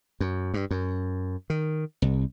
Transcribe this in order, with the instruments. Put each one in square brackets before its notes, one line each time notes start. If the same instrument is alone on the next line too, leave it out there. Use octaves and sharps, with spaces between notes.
[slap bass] F#2
G2
F#2
D#3
C2